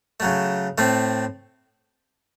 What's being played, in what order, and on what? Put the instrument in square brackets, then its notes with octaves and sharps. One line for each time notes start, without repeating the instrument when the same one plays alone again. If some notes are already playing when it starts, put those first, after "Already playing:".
[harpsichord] C#3 F#3 A3
A2 A3 C4